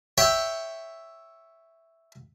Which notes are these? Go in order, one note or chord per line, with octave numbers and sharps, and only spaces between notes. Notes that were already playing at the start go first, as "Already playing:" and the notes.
C#5 E5 G5 C#6